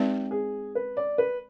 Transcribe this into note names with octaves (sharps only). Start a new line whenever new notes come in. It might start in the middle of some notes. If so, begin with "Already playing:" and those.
Already playing: G#3 C4 D#4 G4 B4 D5
G#4
B4
D5
B4